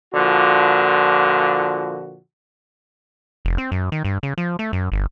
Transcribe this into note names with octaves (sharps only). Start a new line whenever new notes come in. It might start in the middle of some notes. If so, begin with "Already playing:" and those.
A#2 D3 F3 F#4
F1
C4
F#2
D#3
G2
C#3
F3
A3
F#2
G1